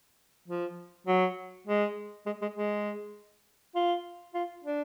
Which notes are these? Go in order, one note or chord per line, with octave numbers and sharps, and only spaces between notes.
F3
F#3
G#3
G#3
G#3
G#3
F4
F4
D4